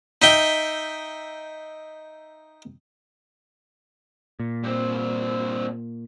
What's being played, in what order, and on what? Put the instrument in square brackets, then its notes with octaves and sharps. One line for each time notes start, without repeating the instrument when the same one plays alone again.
[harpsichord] D#4 E5 G5
[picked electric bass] A#2
[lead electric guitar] G2 C4